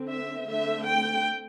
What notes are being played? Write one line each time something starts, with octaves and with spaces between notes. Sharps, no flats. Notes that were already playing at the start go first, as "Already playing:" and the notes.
Already playing: D3 C4
E5
D3 A3 C4 E5
G5